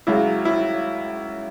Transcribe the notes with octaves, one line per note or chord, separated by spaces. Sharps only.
C#2 C#3 F#3 E4
E4